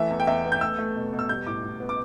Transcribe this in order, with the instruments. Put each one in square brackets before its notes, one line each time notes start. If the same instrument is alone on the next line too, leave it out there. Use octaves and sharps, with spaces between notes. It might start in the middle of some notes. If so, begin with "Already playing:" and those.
Already playing: [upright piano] E3 A3 E5
E2
G5
E2 E5
B3
G6
A3 E6
A3
B2
B2
E6
G3 G6
A2 D6
A2
B3
D6